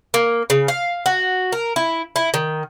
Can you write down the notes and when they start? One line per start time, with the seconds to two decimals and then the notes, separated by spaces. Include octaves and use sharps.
0.14 A#3
0.50 C#3
0.68 F5
1.06 F#4
1.52 A#4
1.76 E4
2.16 E4
2.34 D#3